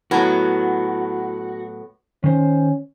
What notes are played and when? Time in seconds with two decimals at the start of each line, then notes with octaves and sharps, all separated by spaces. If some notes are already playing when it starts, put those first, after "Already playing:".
0.11 A2 F#3 B3 F#4
2.24 D#3 C#4 C5